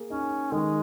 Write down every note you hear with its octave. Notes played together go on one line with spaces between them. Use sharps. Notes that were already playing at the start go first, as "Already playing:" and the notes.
Already playing: A#3 G#4
C#4 D#4
D#3 G#3